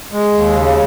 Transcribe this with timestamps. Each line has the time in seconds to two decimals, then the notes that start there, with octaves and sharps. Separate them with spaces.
0.12 G#3
0.34 D#2
0.56 C#3